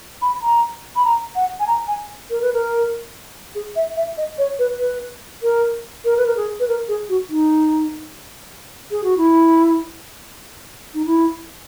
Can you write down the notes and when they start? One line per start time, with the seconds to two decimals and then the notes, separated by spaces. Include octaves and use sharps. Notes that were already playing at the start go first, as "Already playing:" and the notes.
0.22 B5
0.42 A#5
0.96 B5
1.04 A#5
1.36 F#5
1.60 G#5
1.67 A#5
1.88 G#5
2.30 A#4
2.42 B4
2.53 A#4
3.55 G#4
3.76 E5
3.96 E5
4.17 D#5
4.38 C#5
4.59 B4
4.79 B4
5.43 A#4
6.05 A#4
6.17 B4
6.26 A#4
6.37 G#4
6.60 B4
6.68 A#4
6.88 G#4
7.09 F#4
7.30 D#4
8.91 G#4
9.04 F#4
9.17 E4
10.94 D#4
11.05 E4